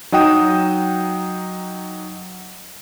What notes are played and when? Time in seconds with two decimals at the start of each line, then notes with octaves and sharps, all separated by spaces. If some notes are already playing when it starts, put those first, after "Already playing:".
0.12 F#3 D#4 F#5 G5 D#6 E7